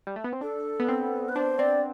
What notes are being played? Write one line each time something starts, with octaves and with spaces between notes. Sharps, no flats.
G3
A3
B3
C4
D4 A4
B3
C4
B4
D4 C5
C4 D5